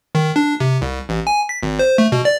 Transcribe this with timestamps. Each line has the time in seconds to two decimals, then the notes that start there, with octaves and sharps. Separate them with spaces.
0.15 D#3
0.36 D4
0.60 C3
0.82 C2
1.09 A1
1.27 G#5
1.49 B6
1.63 G#1
1.79 C5
1.98 A3
2.12 B2
2.25 D5